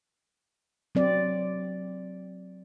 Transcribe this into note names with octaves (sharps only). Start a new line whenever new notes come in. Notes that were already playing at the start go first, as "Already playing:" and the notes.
F#3 C4 D5